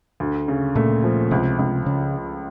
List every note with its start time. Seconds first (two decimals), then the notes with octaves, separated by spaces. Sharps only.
0.20 D2
0.48 C#3
0.75 A#2 A3
1.04 F3
1.31 C#2 C3
1.59 C#2
1.86 C#3